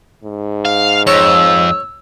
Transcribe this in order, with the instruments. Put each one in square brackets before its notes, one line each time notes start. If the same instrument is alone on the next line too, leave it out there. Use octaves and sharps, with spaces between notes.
[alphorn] G#2
[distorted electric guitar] F5
[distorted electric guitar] F2 [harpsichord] C#5 [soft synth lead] E6